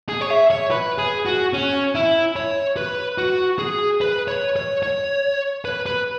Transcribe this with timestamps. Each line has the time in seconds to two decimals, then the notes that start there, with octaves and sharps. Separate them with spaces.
0.09 G#4
0.21 C#5
0.30 E5
0.50 C#5
0.71 B4
0.98 G#4
1.26 F#4
1.53 C#4
1.95 E4
2.36 C#5
2.77 B4
3.18 F#4
3.59 G#4
4.01 B4
4.28 C#5
4.56 C#5
4.83 C#5
5.65 B4
5.86 B4